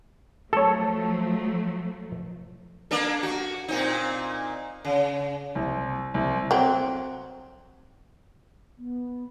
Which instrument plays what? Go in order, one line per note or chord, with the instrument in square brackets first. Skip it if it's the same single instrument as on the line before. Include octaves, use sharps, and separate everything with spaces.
[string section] F3 F#3 A3 [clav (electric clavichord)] A4 C#5
[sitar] A#3 D4 A4
F#4
A#2 C4 D#4
C#3
[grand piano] C2
C2
[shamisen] F#3 C4
[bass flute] B3